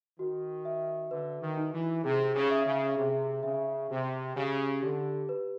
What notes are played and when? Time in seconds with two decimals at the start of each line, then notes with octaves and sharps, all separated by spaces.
0.19 D#3 F#4
0.65 E5
1.11 D3 B4
1.42 D#3
1.57 D#4
1.74 E3
2.04 C3 G#4
2.35 C#3
2.50 E5
2.66 C#3
2.97 C3 G#4
3.43 C#3 E5
3.90 C3 G4
4.36 C#3 G4
4.83 D3 G4
5.29 B4